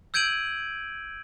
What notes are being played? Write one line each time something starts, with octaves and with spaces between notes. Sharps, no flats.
E6 G6 G#6 D7 D#7 F#7